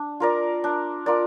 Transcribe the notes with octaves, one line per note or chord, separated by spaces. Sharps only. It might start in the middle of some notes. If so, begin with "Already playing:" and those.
Already playing: D4
F4 A#4 D5
D4
F4 A#4 D5